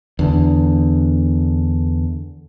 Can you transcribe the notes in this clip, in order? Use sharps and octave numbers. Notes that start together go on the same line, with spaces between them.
E2 D3